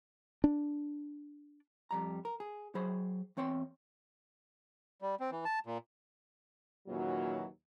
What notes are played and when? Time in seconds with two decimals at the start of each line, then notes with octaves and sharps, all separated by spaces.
0.44 D4
1.91 F2 G3 A#5
2.25 A#4
2.40 G#4
2.75 F#3 G#4 C5 B5
3.37 E2 C4 C#5 G5 C6
5.02 G3
5.20 C4
5.32 E3
5.45 A5
5.66 A#2
6.87 D#2 A#2 C#3 E3 F#3